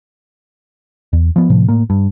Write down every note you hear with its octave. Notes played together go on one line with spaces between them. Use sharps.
E2
F3 B3
A2 C3 F3
A2 A#3
G2